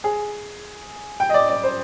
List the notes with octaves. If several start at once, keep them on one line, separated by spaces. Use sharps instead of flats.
G#4
G5
D#5
D5
D5
C5